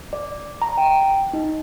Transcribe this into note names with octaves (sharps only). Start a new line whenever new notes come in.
D5
A#5
G5
D#4